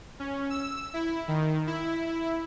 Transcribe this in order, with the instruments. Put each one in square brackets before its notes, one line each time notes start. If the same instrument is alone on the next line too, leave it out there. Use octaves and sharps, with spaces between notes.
[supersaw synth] C#4
E6
E4
D#3
E4
E4